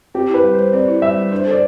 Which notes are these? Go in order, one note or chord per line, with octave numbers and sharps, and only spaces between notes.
C4 G4
E4
B4
G3
C5
G3
C4 D5
E4
G3 E5
G3
D4 C5
A4 D5